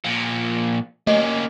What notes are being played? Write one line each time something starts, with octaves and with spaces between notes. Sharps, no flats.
A#2 F3
A3 A#3 C#4 D#5